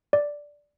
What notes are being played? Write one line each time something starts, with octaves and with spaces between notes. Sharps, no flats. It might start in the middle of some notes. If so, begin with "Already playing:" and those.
D5